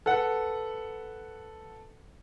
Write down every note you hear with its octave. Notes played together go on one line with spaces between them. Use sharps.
A4 B4 F#5